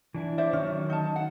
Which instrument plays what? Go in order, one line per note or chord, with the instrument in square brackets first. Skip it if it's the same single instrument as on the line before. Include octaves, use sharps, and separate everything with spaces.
[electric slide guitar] E3 D4 E4
[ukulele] C5 D5 E5
[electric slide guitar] D#3 F#3 [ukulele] C#4
[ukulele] D#4 A5
F#5